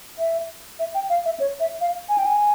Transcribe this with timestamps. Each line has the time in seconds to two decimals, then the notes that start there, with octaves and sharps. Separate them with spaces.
0.19 E5
0.79 E5
0.95 G5
1.10 F5
1.25 E5
1.40 C#5
1.60 E5
1.81 F5
2.09 G#5
2.18 G5
2.26 G#5